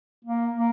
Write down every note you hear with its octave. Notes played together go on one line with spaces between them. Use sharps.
A#3
A#3